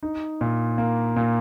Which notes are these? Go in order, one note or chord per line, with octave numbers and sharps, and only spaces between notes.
D#4
A#2
A#3
A#2